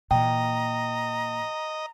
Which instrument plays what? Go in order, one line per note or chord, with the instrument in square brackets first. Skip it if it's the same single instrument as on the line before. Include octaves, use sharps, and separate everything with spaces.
[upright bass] A#2 E3 [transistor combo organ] D#5 [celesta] G5 [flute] A#5